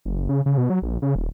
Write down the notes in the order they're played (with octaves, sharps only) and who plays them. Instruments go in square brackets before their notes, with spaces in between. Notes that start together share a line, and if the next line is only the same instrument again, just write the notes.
[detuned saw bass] F#1
C#3
C#3
B2
F#3
A#1
C#3
D#1